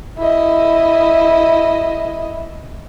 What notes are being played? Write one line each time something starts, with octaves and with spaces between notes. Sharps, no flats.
E4 D#5